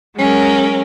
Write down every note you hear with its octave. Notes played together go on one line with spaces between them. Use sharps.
F#3 G#3 C#4 A#4